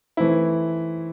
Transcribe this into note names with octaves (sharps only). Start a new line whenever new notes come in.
E3 A3 C4 E4